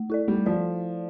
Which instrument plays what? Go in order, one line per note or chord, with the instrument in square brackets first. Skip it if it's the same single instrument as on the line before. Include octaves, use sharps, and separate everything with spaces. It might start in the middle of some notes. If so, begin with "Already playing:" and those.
Already playing: [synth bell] A3
E4 A4 D5
[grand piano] G3 [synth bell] A3
[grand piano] F3 [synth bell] D5